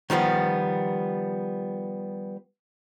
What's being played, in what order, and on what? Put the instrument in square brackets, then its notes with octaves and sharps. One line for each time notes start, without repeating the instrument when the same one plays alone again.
[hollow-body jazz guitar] D#3 F3 G3 B3